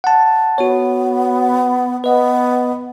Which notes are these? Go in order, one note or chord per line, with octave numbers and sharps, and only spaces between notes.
F#5 A5
B3 F#4 C#5
B3 B4 D#5